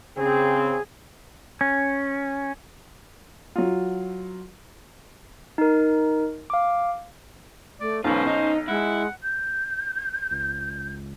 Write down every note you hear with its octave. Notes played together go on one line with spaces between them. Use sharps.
C#3 C4 G#4
C#4
F#3 F4
D#4 A#4
F5 D6
A3 D5
B1 C#4 F4 B4 C5
D#4
G#3 E4 F#5
G6
C#2